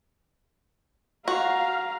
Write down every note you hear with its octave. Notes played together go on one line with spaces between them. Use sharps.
F#4 F5 A#5